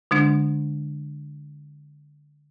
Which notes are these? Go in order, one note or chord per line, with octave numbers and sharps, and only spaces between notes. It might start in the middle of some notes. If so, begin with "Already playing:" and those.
D3 G#3 D4